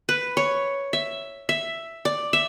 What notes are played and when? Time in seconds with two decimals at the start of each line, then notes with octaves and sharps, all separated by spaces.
0.09 B4
0.37 C#5
0.93 E5
1.49 E5
2.05 D5
2.33 E5